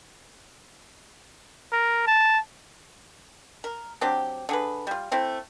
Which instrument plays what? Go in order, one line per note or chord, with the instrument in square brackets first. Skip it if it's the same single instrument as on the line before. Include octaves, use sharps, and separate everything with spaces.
[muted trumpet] A#4
A5
[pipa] A#4
F#3 C4 D4 G4
D3 G#4 B4
G3 F4
A3 C4 E4